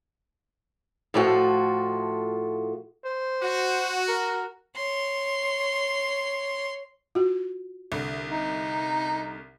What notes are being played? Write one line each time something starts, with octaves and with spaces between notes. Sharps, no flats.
A2 F3 A3 F4 F#4
C5
F#4
A#4
C#5 C6
F4 F#4
C2 D3
D#4